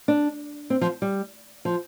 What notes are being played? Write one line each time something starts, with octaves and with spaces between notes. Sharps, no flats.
D4
C4
F3
G3
F3